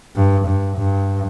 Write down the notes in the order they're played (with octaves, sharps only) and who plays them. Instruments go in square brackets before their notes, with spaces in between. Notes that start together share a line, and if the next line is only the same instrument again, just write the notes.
[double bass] G2
G2
G2